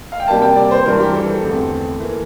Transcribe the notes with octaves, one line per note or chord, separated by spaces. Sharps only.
F5
G5
C3 G3 A#3 A5
G5
D5
C5
G2 E3 G3 A#4
G4
A4
A4
E2 D3 A3 C4
E3 A#3